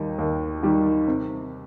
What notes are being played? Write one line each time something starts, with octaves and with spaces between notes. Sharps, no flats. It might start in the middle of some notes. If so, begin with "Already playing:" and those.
Already playing: D#2 D#3 G3 D#4 G4
D#2
D#3 G3 D#4 G4
C3